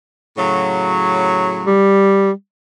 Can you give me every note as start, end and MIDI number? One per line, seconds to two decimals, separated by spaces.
0.37 1.78 45
0.37 1.78 49
0.37 1.78 54
1.66 2.31 55